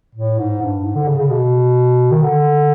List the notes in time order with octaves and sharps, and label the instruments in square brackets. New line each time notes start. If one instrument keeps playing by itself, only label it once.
[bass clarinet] A2
G#2
G2
G#2
D3
C#3
C#3
B2
D#3
D3